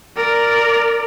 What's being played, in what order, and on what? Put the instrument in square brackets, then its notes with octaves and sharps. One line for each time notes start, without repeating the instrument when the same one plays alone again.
[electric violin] A#4 D5